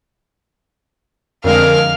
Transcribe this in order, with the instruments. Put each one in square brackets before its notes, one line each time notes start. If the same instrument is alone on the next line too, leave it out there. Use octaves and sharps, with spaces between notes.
[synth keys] F2 D3 G#3 [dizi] A#4 [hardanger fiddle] F5